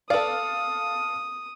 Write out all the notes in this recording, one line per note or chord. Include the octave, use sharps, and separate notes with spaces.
A4 B4 D5 F5 D#6